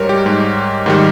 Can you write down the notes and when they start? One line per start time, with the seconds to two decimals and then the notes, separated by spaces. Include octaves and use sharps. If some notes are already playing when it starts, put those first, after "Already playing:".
Already playing: G#2 G3 A#4 C#5
0.09 G4
0.25 G#2 G3
0.86 G#2 D#3 G3